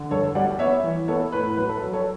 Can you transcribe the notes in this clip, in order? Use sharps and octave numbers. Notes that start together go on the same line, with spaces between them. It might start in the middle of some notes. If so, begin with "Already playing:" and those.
Already playing: D3
G2 A4 C#5
G3 D5 F#5
B3 C#5 E5
E3
B3 A4 C#5
A2 B4
F#3 B4
A4
F#3
A4 C#5